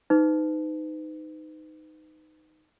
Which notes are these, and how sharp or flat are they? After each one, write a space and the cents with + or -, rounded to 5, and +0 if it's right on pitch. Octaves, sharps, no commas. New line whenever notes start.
D#4 +0 B4 +40